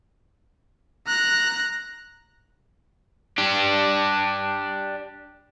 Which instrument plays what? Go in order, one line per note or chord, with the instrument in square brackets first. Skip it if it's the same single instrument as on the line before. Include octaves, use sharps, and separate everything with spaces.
[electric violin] A#5 F#6
[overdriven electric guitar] D4 G4